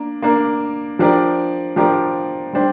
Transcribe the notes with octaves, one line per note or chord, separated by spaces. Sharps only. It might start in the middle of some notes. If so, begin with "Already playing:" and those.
Already playing: A#3 D4 A#4
A#3 D4 A#4
F3 D4 G4 A#4 D5
F3 D4 G4 A#4 D5
G3 D4 G4 C5